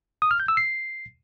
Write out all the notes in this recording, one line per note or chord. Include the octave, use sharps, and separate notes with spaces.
D#6
F6
G6
E6
C7